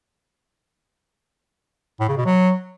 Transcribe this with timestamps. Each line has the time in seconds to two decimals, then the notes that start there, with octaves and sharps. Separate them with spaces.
2.00 A2
2.09 C#3
2.17 B2
2.26 F#3